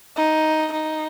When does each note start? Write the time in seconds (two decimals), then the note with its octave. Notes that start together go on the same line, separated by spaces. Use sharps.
0.17 D#4
0.72 D#4